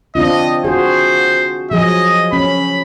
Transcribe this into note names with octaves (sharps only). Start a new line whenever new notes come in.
C4 D4 F4 D#5
F#4 G#4 C5
F3 F#3 G#4 D#5
C#4 B5